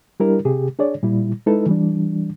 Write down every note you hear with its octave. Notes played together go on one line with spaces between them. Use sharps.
G3 D4 E4 G4 A#4
C3 G4 G#4
D4 G#4 C#5 D5
A#2 G3 E4
G#3 D#4 E4 A4 B4
E3 G3 D4